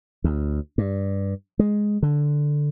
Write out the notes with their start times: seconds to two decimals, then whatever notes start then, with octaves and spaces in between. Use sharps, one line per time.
0.24 D2
0.78 G2
1.59 G#3
2.03 D3